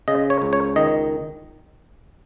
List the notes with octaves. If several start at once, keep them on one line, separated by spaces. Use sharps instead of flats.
C#3 D#5
C#5
C#2
C#5
D#3 D#5